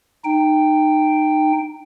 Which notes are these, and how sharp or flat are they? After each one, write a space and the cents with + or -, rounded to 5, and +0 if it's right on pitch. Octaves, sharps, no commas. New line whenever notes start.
D#4 -25 G5 +0